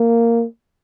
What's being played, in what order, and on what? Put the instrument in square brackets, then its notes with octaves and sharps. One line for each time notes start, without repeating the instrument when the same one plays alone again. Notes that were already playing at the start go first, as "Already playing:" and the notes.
Already playing: [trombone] A#3